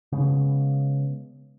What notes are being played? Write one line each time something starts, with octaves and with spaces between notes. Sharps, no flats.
C#3 G#3 A3 B3